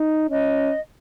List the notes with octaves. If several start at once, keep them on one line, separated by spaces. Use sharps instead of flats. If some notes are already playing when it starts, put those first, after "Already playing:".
Already playing: D#4
C#4 D#5